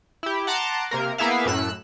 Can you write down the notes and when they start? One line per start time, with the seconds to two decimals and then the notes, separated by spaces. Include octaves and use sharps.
0.23 E4 G4
0.47 F#5 A5 A#5 C6 D6
0.91 C3 A#3 A#4
1.18 A#3 B3 E4 G#4 E5 F5
1.45 F#2 A2 E6 F#6